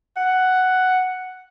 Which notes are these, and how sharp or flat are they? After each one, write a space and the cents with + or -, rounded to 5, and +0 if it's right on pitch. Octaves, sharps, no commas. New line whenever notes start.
F#5 +5